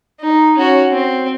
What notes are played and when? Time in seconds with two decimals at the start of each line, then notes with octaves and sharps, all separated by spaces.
0.21 D#4
0.57 C#4 F#4
0.92 C4